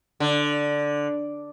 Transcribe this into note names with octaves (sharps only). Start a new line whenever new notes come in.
D3